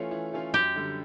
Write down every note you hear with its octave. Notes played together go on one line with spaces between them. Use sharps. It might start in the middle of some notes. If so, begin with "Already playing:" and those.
Already playing: E3 A3 C#4 F4
E3
A3 C#4 F4
F#2 G4
D3 G3